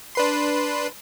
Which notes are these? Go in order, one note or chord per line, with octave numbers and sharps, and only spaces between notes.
D4 B4 C6